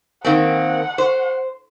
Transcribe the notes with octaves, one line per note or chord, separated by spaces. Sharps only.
D#3 A#3 C4 F#5
C5